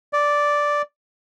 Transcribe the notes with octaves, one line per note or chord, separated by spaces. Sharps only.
D5